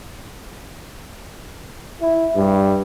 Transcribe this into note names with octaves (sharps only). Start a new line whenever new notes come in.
E4
G2